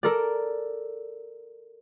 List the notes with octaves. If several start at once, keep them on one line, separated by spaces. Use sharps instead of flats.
A4 A#4 D5